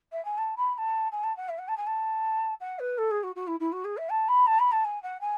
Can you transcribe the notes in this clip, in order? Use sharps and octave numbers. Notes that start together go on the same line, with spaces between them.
E5
G#5
A5
B5
B5
A5
G#5
A5
F#5
E5
F#5
A5
G#5
A5
F#5
B4
A4
G#4
F#4
F#4
E4
E4
F#4
G#4
E5
A5
B5
A5
B5
A5
G#5
F#5
G#5